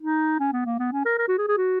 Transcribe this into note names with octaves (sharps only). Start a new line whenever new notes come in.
D#4
C#4
B3
A#3
B3
C#4
A#4
A#4
F#4
G#4
G#4
F#4